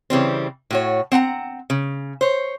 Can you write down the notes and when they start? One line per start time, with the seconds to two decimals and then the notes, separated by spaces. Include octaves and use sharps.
0.10 C#3 E3 G3 C4
0.71 A2 F#4 C#5
1.12 C4 F#5 G#5 A#5
1.70 C#3
2.21 C5 C#5